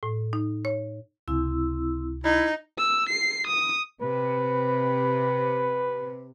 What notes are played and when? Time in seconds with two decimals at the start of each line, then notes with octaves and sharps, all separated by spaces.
0.03 A2
0.33 D#4
0.65 C#5
1.28 C#2 C3 C4 E4 E6
2.24 D#4 E4
2.78 E6
3.09 C7
3.47 D#6
4.02 C3 B4